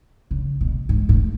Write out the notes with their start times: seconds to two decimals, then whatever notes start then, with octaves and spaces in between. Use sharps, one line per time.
0.31 C#3
0.61 B2
0.89 G#2
1.09 A2